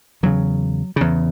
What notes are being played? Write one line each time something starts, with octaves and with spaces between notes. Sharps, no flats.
E2 C#3 F#3
E2 C#3